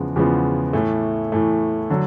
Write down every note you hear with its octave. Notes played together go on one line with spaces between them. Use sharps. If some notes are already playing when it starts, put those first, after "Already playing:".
Already playing: E2 C#3 F3 G#3 B3
E2 C#3 F3 G#3 B3
A2 E3 A3
A2 E3 A3
D3 F#3